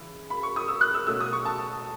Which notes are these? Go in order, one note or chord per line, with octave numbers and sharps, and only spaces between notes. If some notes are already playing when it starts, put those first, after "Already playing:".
Already playing: C#3 E3
B5
C#6
D#6
E6
F#6
E6
B2 A3 C#4 E6
D#6
C#6
A5